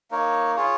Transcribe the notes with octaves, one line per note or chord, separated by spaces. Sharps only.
A#3 D#4 A#4 C#5
F4 G#4 C#5